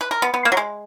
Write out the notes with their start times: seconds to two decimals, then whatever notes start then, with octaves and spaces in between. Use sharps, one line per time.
0.01 B4
0.11 A#4
0.22 B3
0.34 B3
0.45 A#3
0.52 F#3
0.57 G#3